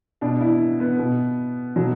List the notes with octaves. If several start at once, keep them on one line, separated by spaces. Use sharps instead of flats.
B2 D4
E4
B3
B2
B2 F#3